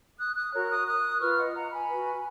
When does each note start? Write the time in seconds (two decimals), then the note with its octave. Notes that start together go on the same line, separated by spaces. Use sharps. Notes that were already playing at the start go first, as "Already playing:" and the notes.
0.18 D#6 F#6
0.35 D#6 F#6
0.52 F#4 A#4 C#5
0.70 D#6 F#6
0.86 D#6 F#6
1.21 F4 B4 C#6 F6
1.38 D#5 F#5
1.55 F#5 A#5
1.72 G#5 B5
1.89 F#4 B4